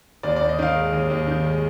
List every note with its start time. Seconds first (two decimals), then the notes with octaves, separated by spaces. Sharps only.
0.23 D#2 D5
0.36 D#2 D5
0.49 D#5
0.59 D#3 F5
0.75 G#3
0.92 D#2
1.10 D#2
1.27 D#3
1.45 G#3